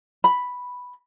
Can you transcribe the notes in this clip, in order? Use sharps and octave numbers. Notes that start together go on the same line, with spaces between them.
B5